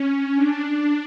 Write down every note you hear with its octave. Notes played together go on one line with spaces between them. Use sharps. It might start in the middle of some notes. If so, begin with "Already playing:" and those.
Already playing: C#4
D4